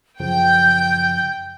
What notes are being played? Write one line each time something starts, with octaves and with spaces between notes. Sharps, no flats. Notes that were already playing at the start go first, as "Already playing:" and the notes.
F#2 C#3 F3 G5 G6